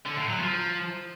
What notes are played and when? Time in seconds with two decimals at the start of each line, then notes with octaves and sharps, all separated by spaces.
0.06 D3
0.17 A2
0.28 F#3
0.39 F3